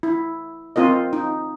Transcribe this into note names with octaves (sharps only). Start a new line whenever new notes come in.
E4
C4 F4 A#4 D#5
D#4